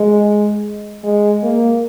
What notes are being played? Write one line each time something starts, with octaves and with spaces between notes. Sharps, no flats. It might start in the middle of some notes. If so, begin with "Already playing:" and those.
Already playing: G#3
G#3
A#3